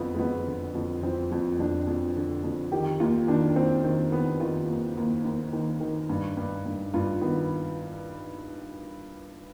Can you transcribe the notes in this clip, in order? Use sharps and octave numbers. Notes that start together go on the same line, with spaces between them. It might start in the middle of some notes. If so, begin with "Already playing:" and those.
Already playing: F2 D3 F3 B3 F4
G#3
F2 B3
D3
F2
F3 C4
F2
F2 D4
F2
D3
F2
D#3 G4
D#2 F4
D#3 D4
D#2 C4
D#3 C4
D#3 B3
D#3 F4
D#2
D#2
D#2
D#3
D#3
G2
G2
G2
G2 F4
D#3 B3